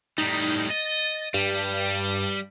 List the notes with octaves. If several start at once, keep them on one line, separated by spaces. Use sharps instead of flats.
A2 G3 D#4
D#5 A6
G2 G3